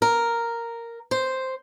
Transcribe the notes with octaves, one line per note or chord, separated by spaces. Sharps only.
A#4
C5